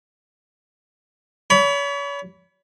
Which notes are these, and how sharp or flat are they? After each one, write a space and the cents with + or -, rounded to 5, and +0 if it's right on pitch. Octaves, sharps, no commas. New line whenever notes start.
C#5 +40 B5 +0